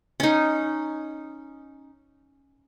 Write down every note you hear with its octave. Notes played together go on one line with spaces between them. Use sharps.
C#4 D#4